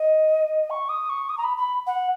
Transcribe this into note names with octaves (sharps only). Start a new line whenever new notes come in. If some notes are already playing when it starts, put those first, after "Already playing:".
Already playing: D#5
C#6
D#6
C#6
D#6
A#5
B5
B5
F#5